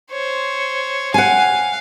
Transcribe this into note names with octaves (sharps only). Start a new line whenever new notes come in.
C5 C#5
F5 F#5 G#5